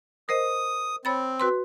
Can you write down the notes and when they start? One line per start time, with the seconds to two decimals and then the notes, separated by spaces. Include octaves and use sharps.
0.29 A#4 C5 D#5 D#6
1.05 C4 C#5 B5 A6
1.40 F#4 B4 C6